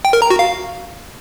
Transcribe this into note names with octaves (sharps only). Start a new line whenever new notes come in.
G5
A#4
A#5
F#4
F5